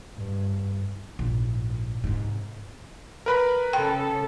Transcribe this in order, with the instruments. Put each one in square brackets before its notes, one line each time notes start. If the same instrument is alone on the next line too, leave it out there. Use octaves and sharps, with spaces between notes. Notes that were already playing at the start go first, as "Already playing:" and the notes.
[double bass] G2
[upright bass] A#1 G#2
G#2 C3
[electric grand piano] A#4 B4 B5
[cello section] C#3 A4 [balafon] G5